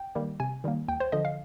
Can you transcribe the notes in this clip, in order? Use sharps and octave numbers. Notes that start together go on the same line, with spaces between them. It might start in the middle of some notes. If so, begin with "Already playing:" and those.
Already playing: G5
D#3 G3 A#3
C3 G#5
D#3 G3 A#3
D#2 G5
C5
D3 F3 D#5
F5